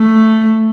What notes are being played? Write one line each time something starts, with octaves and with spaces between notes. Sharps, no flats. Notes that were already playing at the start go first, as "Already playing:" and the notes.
Already playing: A3